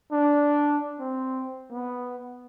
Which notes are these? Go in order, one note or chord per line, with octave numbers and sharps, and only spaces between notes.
D4
C4
B3